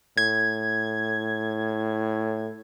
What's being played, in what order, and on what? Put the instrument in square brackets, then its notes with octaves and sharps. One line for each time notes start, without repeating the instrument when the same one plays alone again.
[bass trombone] A2 [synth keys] G#6